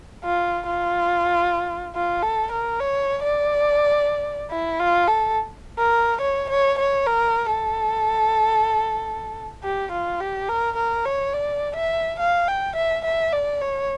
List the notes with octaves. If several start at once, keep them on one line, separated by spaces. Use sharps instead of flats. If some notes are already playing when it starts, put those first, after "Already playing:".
F4
F4
F4
A4
A#4
C#5
D5
E4
F4
A4
A#4
C#5
C#5
C#5
A#4
A4
G4
F4
G4
A#4
A#4
C#5
D5
E5
F5
G5
E5
E5
D5
C#5